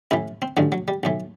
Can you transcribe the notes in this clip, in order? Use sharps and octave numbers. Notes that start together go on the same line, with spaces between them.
A1 A2 E3 E4
C4
A1 G2 D3 F#3
F#3
G3
B1 A2 E3